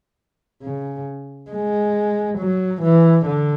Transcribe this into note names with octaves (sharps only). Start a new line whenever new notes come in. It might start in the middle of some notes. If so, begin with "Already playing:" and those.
C#3
G#3
F#3
E3
D3